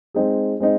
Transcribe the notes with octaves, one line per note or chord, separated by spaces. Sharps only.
G#3 C4 D#4 G#4
G#3 C4 D#4